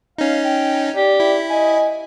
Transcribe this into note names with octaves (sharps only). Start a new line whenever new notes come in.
C#4 D#4 F5
G5
G4 D5
E4
D#5 G#5